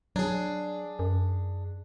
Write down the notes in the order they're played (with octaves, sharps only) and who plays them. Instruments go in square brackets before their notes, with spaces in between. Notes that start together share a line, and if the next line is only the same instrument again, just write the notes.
[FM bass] F#3 [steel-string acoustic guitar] D4 G#4
[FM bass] F#2